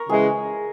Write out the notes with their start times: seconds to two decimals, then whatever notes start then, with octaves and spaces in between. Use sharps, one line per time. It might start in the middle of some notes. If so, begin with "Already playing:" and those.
Already playing: A#4 C#5
0.09 C#3 E3 G#3 G#4